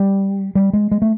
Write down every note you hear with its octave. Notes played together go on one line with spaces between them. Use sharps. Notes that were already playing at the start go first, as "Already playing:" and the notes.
Already playing: G3
G3
G#3
G#3
A3